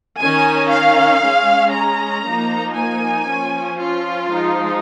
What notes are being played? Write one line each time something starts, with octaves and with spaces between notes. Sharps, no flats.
D#3 C#4 G#5
F5
G#3 C#4
A#5
F3 A#3 D#4
G#5
F3 C#4
F4
F3 G#3 D#4